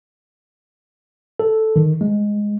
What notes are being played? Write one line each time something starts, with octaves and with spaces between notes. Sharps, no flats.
A4
D#3
G#3